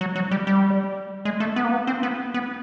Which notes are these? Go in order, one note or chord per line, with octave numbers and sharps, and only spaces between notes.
F#3
F#3
G3
G3
G#3
A3
B3
A#3
B3
C4
B3
B3